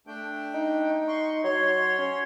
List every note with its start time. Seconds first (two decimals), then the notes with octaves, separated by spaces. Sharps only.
0.07 A3 D4 G5
0.54 D#4
1.08 C6 C#6
1.44 F#3 C#5 C6
1.98 C#4